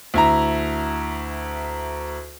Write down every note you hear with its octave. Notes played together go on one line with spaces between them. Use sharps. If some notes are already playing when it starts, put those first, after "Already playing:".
D2 E4 A#5